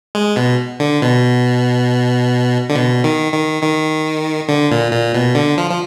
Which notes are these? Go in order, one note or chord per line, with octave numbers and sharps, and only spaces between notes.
G#3
B2
D3
B2
D3
B2
D#3
D#3
D#3
D3
A#2
A#2
B2
D3
F3
F3